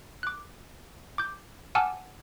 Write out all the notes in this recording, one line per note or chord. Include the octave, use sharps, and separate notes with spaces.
D6 F#6
D6 G6
F#5 G#5 A5 D6 E6 F6